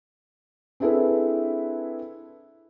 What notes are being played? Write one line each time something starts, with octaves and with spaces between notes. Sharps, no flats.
C4 D4 E4 G#4 A4 B4